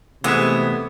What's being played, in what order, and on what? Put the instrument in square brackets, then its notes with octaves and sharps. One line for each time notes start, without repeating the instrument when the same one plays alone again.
[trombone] C3 [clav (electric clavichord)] E3 G#3 E5 [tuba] A3 [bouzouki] B3